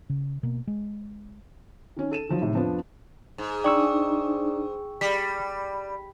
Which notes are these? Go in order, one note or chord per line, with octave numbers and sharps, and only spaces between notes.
C#3
B2 A#3
G#3
D#3 C#4
A4 D#7 E7
D#3 F3 F#3 D#4
A2 C3 D#3
F2 F3 B3 D4
G#2
D4 D#4 D5 G5 C#6 E6
G3 B5 B6